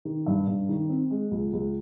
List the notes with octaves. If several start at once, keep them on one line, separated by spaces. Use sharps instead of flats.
D#3
G2
G2
D#3
C4
G#3
C#2
C#2